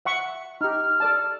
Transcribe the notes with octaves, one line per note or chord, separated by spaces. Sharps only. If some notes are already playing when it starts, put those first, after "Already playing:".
E5 F#5 C#6
D#4 G4 F6
A4 D5 A5